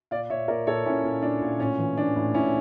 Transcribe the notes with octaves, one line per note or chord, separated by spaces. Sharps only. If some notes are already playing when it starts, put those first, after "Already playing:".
A#2 D5 F5
A#2 C#5 E5
A#2 A#4 D5
A#2 A4 C#5
A#2 C#4 E4
A#2
A#2 D4
A#2
A2 C#4
E3
E3 D4
A2
A2 C#4 E4